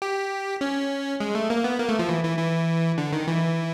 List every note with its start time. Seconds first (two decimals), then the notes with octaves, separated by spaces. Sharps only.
0.02 G4
0.61 C#4
1.20 G#3
1.35 A3
1.50 A#3
1.64 B3
1.80 A#3
1.89 A3
1.99 F3
2.09 E3
2.24 E3
2.38 E3
2.98 D3
3.13 D#3
3.28 E3